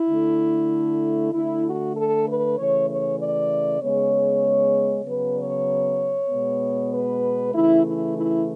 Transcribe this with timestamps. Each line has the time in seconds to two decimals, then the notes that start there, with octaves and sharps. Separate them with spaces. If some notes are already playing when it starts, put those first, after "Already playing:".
Already playing: E4
0.10 D3 A3
1.34 D3 A3 E4
1.65 F#4
1.96 A4
2.27 B4
2.58 C#3 E3 A3 C#5
2.89 C#5
3.19 D5
3.81 C#3 G#3 B3 C#5
5.05 C#3 F#3 B3 B4
5.36 C#5
6.29 B2 G#3 B3
6.91 B4
7.53 C#3 E3 A3 E4
7.84 E4
8.15 E4